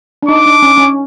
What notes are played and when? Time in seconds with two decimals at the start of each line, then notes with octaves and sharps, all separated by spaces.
0.23 D4
0.28 D#4 D6
0.46 D4
0.62 C#4
0.78 C#4